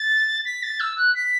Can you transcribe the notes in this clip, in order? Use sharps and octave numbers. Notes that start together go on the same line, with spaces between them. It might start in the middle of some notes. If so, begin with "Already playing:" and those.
Already playing: A6
B6
A6
E6
F#6
B6